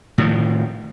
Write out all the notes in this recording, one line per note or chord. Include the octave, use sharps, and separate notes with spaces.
A2 D#3 F3